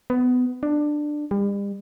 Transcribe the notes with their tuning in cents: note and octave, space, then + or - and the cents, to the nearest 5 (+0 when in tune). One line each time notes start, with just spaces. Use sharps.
B3 +20
D4 +15
G3 +40